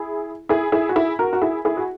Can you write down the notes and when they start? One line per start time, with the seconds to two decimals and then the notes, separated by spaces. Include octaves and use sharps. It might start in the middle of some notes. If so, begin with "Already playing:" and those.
Already playing: E4 G#4
0.49 E4 G#4
0.72 E4 G#4
0.89 F#4
0.96 E4 G#4
1.19 F#4 A#4
1.33 F#4
1.42 E4 G#4
1.65 E4 G#4
1.77 F#4